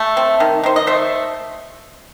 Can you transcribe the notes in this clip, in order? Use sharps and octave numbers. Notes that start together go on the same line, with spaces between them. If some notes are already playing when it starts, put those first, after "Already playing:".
Already playing: A3
C4
D#3
D#3 C5
D#5
A3 C5 E5